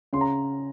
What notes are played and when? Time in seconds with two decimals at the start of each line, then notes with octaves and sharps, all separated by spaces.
0.13 C#3 C6
0.21 A#5